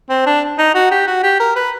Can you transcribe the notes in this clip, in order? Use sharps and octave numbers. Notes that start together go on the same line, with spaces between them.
C4
D4
D#4
F#4
G4
F#4
G4
A#4
B4